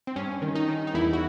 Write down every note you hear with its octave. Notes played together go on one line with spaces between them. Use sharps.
C4
G2 C#4
D#3
D#4
D#3
D#4
E2 E4
F#4